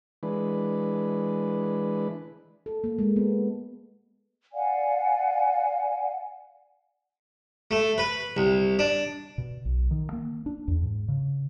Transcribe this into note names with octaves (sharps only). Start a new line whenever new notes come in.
E3 G#3 D4 B4
A4
A#3
G#3
B3
D5 F5 F#5 G#5
A3
B4
C2
D4
B2
B1
D#3
A#3
D4
E2
G#2
C#3